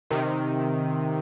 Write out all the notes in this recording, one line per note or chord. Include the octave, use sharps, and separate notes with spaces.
C3 D#3